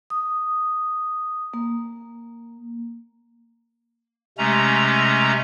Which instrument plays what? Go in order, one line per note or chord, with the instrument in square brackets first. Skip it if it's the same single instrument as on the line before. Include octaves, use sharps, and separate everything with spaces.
[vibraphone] D#6
A#3
[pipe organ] C3 G#3 A3 C#4 A#5